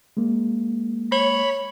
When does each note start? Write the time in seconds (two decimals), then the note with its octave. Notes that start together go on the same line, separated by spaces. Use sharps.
0.17 G#3 A#3
1.12 C#5 B5